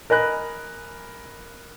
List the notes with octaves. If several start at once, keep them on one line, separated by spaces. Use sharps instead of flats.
A#4 D#5 G#5 B5 F#6